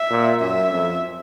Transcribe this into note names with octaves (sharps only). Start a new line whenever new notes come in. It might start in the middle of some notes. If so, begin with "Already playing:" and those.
Already playing: E5
A#2
F#2 E5
F2